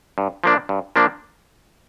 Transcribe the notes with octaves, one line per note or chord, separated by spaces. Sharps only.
G2
F3 A#3 D4
G2
F3 A#3 D4